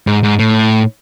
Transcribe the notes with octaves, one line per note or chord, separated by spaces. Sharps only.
G#2
G#2
A2